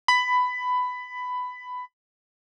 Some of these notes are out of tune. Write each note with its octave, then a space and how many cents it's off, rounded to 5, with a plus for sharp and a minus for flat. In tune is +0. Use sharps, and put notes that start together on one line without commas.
B5 +15